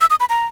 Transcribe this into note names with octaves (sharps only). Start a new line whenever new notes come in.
E6
D#6
B5
A#5